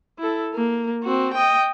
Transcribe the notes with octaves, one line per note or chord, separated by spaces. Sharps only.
E4 A4
A#3
C4 F#4
D#5 G5